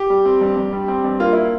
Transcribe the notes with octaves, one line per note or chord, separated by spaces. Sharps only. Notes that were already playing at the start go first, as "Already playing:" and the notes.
Already playing: G4
G3
C4
G2
G2
G3
C4
G2
A#3 F4
E4